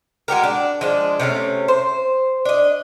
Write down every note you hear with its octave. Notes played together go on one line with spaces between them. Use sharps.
G#3 F#4 G4 A#4
D4
F3 G#3 D4
C3 A3 B3 C#4
C5
D4 D#5